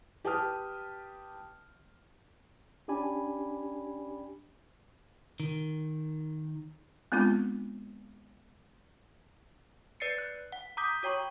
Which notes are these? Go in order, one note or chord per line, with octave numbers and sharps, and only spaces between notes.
G4 B4 G5 A5 D#6 F6
C#4 D4 G4 D5 G#5 B5
D#3
G#3 B3 C4 D4 F4
B4 D5 A6 C7 C#7
F#6
F#5
A#5 D6 D#6 G6 B6
F#4 C#5 G5 A#5 C#6